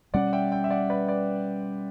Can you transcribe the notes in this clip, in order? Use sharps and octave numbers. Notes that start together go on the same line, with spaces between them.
B2 G3 C#4 D5 F#5
E5 G5
E5 G5
E5
D5 F#5
B4 D5
B4 D5